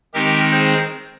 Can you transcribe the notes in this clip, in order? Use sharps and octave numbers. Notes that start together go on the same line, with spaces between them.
D#3 G#3 C4 D#4 G4 A#4
G#4 C5